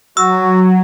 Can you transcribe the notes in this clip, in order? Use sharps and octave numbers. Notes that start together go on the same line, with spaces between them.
F#3 F#4 E6